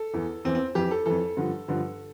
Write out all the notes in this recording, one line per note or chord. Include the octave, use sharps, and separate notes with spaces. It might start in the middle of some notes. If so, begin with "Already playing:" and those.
Already playing: A4
E2 E3
E2 E3 C4
C4
F2 E3 G4
A4
F2 E3 A4
G2 D3 F3
G2 D3 F3